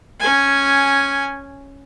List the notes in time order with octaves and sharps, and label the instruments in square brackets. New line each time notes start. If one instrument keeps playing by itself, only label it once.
[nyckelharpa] C#4 G#5